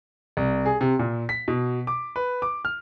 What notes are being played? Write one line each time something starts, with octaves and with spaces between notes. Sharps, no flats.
C2
G#4
C3
A#2
B6
B2
D6
B4
D6
F6